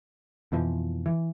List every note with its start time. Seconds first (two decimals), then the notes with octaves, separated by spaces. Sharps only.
0.52 F2 B2 E3 F3
1.06 E3